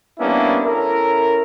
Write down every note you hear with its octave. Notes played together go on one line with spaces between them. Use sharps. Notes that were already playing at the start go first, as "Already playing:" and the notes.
G3 A#3 B3 C#4 D4 E4
C#4 E4 A4 A#4